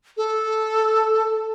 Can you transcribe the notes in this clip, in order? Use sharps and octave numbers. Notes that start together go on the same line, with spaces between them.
A4